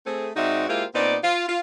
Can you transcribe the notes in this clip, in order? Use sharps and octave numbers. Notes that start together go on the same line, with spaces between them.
A3 C4 G#4
G#2 C4 D#4 F#4 D5 E5
G#3 A#3 E4 F4 G4 C5
A#2 B3 C4 D#4 D5
F4
F4